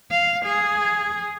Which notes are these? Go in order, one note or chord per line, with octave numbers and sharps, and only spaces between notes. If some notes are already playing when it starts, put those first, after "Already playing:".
F5
G#4